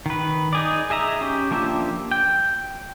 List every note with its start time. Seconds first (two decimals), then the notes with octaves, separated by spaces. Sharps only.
0.06 D#3 B4
0.53 D#4 G#4 D5
0.90 G#4 D#5 E5 A#5
1.21 C#4 G4
1.51 F3 A#3 D4 G4 E5
2.11 G5